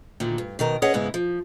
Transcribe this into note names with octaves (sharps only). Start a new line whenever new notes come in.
D2 A#2 D3 D#3
G2
B2 D#3 A#4
C#4 G#4 B4 C#5 D#5 F#5
G#2 C#3 G#3 B3 E4 F5
F3